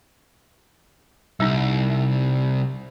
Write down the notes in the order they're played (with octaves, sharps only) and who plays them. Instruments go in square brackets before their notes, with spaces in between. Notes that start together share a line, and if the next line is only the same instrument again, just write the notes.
[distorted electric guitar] C2 [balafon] G3 D#4